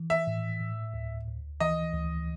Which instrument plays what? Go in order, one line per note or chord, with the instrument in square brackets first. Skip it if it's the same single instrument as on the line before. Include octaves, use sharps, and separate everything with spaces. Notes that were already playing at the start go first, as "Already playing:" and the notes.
Already playing: [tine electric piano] E3
[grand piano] E5
[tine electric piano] A2
A2
D2
D2
[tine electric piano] E3 [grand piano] D#5
[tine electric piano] D2